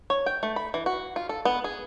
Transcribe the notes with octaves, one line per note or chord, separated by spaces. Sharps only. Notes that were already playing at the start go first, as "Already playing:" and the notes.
C#5
G5
A3
B5
E3
F#4
F4
A4
B3
G#4